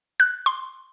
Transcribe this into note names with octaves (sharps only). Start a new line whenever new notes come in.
F#6
C6